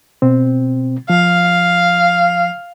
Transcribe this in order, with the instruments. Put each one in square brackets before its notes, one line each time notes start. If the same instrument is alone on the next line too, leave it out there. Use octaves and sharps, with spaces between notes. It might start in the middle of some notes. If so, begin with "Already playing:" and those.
[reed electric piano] B2 C4
[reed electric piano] F3 [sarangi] F5